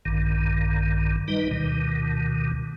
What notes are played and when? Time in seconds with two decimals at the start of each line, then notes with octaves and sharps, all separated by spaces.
0.05 A#1 G2 D#3
1.28 G3 D#4 B4 D#5
1.51 D2 B2 D#3